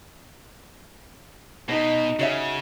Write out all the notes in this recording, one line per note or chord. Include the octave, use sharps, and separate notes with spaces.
B2 D#4
C#3 F#4 C#5 E5